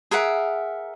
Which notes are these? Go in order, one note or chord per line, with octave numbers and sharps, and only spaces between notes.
G#4 A#4 E5 F#5